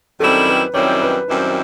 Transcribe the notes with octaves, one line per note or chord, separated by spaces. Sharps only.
F#2 D#3 G3 C4 E4 A4
B4
F#2 D#3 G3 C4 E4 C#5
B4
F#2 D#3 G3 C4 E4 C5